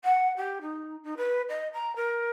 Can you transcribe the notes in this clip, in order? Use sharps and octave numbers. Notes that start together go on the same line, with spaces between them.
F#5
G4
D#4
D#4
B4
D#5
A#5
A#4